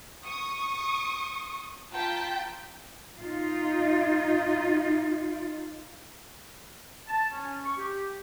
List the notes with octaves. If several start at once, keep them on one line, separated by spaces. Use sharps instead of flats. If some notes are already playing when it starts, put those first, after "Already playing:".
C#6 D#6
F4 G5 A5 A#5 G6 B6
D#4 F4
A5
C#4
C#6
G4